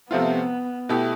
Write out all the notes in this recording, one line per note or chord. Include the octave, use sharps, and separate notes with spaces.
C3 F3 A3 B3 C4 F4
B2 A3 E4 G4